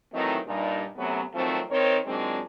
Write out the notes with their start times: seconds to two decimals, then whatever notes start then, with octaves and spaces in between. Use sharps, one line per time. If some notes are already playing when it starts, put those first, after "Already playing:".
0.13 D#3 E3 F#3 A3 C4 D#4
0.47 G2 A#2 D#4
0.97 F#2 C3 F#3 A3 B3 C#4
1.34 D#3 F3 F#3 A3 C4
1.70 D#3 C4 A#4 C5 C#5
2.06 A#2 D#3 F#3 G#3 C4 D4